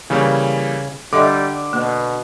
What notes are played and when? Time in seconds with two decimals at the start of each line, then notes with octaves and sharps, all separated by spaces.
0.10 C#3 E3 G3 A#3
1.13 D3 G3 A4 D#5 E5 D6
1.73 B2 A#3